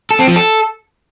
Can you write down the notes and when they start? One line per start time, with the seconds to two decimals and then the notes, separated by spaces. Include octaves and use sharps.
0.11 A4
0.19 C4
0.28 F3
0.36 A4